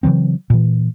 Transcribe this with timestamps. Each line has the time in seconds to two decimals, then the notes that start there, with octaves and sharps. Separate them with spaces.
0.03 C#3 E3 F#3 C4
0.50 A#2 E3